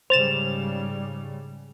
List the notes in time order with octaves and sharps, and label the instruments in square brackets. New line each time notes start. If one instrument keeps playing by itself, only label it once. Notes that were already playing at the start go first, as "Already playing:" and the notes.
[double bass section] G#2 C#3 G3 [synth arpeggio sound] C5 A6 E7 [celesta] F7